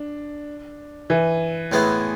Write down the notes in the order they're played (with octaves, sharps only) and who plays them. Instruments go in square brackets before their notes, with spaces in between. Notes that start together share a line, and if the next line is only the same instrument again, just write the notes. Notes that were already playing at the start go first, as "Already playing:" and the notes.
Already playing: [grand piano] D4
E3
[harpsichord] A2 G#3 B3 E4